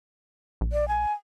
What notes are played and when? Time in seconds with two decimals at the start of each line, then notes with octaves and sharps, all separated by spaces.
0.61 A#1
0.72 D5
0.88 G#5